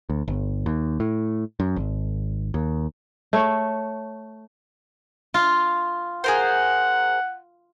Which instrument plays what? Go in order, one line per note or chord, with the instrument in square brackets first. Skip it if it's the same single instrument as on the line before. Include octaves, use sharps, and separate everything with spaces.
[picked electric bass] D2
G1
D#2
A2
F#2
G#1
D#2
[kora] A3 C#5
[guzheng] F4
[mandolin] G#4 A#4 C5 [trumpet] F#5